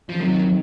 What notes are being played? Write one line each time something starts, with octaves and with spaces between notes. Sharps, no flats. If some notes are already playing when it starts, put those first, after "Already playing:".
F3
C#3
C3 D#3 F#3
D#3